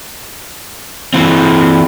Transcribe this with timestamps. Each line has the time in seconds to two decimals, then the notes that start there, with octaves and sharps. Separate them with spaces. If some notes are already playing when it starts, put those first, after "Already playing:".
1.14 E3 C4